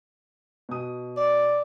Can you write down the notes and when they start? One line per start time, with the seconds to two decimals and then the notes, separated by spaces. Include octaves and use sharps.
0.69 B2 D#6
1.17 D5